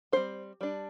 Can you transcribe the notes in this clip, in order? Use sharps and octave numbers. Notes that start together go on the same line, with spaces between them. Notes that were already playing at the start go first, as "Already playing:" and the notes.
G3 C4 D#4 C5
G3 D4